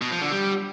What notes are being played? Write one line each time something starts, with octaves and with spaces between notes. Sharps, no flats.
B2
F3
D3
G3